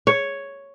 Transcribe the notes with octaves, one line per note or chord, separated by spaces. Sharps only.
C#5